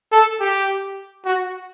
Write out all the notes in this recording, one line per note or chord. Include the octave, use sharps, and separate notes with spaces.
A4
G4
F#4